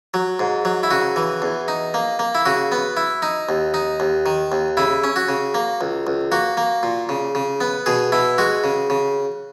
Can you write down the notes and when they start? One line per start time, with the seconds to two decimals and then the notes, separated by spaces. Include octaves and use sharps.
0.14 F#3
0.39 G#2
0.65 F#3
0.83 E4
0.91 C#3 F#4
1.16 E3
1.42 E2
1.68 D#4
1.94 A#3
2.19 A#3
2.35 E4
2.46 C#3 F#4
2.72 B3
2.97 E4
3.22 D#4
3.49 D#2
3.74 D#4
4.00 D#2
4.26 D#3
4.52 D#2
4.77 C#3 E4
5.04 C#4
5.16 F#4
5.29 C#3
5.54 A#3
5.81 C#2
6.07 C#2
6.32 A#3 F#4
6.57 A#3
6.83 A#2
7.09 C#3
7.35 C#3
7.61 B3
7.86 B2 G#4
8.12 B2 E4
8.38 G#3 F#4
8.64 C#3
8.90 C#3